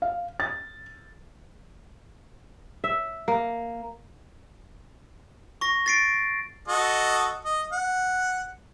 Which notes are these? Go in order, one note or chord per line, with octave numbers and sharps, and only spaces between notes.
F5
A6
E5
A#3
C#6 A#6
A6 C7 D7
F#4 A4 D#5
D#5
F#5